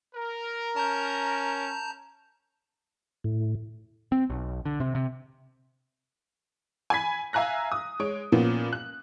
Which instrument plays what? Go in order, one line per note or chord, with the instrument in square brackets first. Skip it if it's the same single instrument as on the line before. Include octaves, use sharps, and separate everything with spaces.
[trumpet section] A#4
[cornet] C#4 [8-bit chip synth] A5 A#5 G6
[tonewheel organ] A2
[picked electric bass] C4
B1
D3
C3
C3
[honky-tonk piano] G#5 B5 G#6 B6
E5 F5 G#5 A#5 F#6 A#6
D#6
G#3 C#5 D7
A#2 F3 A#3 B3 C#4
F#6